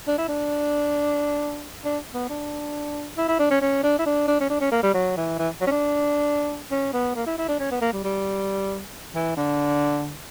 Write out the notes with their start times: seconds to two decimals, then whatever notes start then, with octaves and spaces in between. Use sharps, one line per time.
0.08 D4
0.18 E4
0.28 D4
1.85 D4
2.14 B3
2.29 D4
3.17 E4
3.28 E4
3.39 D4
3.51 C#4
3.61 C#4
3.83 D4
3.99 E4
4.06 D4
4.28 D4
4.40 C#4
4.50 D4
4.61 C#4
4.72 A#3
4.83 G3
4.94 F#3
5.17 E3
5.39 E3
5.61 F#3
5.67 C#4
5.71 D4
6.71 C#4
6.93 B3
7.15 A#3
7.26 E4
7.38 E4
7.48 D4
7.60 C#4
7.71 B3
7.81 A#3
7.93 G3
8.04 G3
9.14 E3
9.37 D3